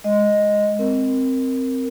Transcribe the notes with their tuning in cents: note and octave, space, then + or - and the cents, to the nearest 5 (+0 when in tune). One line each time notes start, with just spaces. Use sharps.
G#3 +0 D#5 +0
C4 +0 A#4 -5